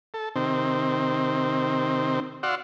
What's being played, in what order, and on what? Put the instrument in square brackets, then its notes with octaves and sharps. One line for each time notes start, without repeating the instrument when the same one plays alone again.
[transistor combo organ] A4
C3 D#3 C4
F#4 D5 F5 F#5 C6 E6